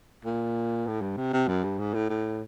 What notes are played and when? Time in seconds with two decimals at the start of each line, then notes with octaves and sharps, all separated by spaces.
0.25 A#2
0.87 A2
1.01 G2
1.17 C3
1.33 C3
1.48 F#2
1.64 G2
1.79 G#2
1.94 A2
2.10 A2